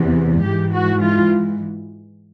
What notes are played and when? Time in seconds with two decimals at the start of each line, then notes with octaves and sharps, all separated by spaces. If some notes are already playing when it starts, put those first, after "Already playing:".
Already playing: E2 C3 E3
0.43 G#2 E3 G4
0.73 F#4
1.02 F4